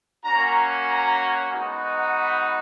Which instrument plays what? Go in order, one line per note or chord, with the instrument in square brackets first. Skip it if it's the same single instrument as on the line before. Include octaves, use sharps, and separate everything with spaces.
[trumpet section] A#3 C#4 F#4 A#5
A#5
G#3 B3 D#4 F#4
B5